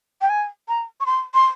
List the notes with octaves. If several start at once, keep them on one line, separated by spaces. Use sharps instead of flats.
G5
G#5
A#5
C#6
C6
C6